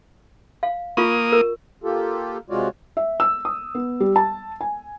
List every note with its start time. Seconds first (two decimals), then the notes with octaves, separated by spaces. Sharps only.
0.63 F5
0.97 A#3 F4 C#6 D#6
1.32 A#4
1.84 A#3 F4 G4 A4
2.50 C3 G#3 F4 F#4 C#5 D5
2.97 E5
3.20 E6
3.45 D#6
3.75 B3
4.00 G3
4.16 A5
4.61 G#5